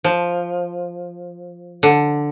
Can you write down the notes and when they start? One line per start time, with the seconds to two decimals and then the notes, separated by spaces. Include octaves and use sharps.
0.04 F3
1.83 D3